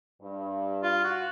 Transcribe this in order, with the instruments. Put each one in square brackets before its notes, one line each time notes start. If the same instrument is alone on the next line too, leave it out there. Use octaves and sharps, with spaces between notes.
[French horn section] G2
[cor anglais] F4
F#4